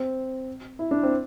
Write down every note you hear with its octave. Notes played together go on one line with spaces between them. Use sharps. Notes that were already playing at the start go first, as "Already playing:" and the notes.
Already playing: C4
E4
D4
C4